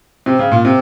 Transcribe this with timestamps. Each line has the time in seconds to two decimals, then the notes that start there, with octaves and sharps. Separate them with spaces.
0.26 C3
0.39 C#3
0.51 A#2
0.65 C3